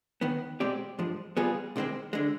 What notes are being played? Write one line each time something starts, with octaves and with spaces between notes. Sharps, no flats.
D#2 D#3 B3
B2 G#3 C4 G4 D5
G2 F3 G#3
G3 B3 F4 G#4
C2 C3 D#3 G#3 C4
D3 G#3